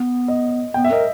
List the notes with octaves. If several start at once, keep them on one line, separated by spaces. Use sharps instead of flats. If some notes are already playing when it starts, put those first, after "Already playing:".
Already playing: B3
D#5
B3 G5
E5
A#4 D#5